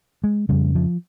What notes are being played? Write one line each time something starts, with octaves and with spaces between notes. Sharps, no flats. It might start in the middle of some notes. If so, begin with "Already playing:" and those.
G#3
F2 C#3 G3
F3